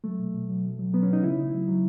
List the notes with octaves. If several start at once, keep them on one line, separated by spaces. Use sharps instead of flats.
F#3 A3
B2
B2
F#3
B2
F#3
F#3 B3
C#4
B2
D#4
C#3 E4
C#3
F#3
F#3